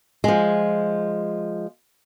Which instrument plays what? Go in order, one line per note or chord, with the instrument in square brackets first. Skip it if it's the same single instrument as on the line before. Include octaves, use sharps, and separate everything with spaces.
[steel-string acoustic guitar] F3 G#3